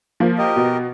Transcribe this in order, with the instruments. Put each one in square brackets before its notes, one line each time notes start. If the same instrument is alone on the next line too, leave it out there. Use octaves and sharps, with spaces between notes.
[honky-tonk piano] F3 A#3
[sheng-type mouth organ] G4 A#4 D#5
[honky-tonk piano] B2